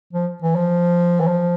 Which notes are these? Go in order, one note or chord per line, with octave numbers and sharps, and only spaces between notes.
F3
E3
F3
E3
F3